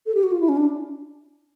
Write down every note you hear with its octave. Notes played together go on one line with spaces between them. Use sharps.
A4
G4
F#4
F4
E4
C#4
D4